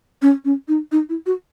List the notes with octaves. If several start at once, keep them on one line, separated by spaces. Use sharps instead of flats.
C#4
C#4
D#4
D#4
E4
F#4